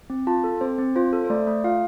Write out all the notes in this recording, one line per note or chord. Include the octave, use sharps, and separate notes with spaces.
C4
F4 A5
A4
C4 C5
C4
F4 C5
A4
C5
A3 D5
A3
F4 F5